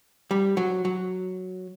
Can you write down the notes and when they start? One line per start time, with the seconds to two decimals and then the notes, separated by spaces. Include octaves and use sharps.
0.31 G3
0.57 F#3
0.85 F#3